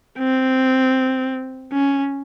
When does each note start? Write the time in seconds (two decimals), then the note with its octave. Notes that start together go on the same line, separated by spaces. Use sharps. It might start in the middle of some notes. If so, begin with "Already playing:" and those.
0.18 C4
1.73 C#4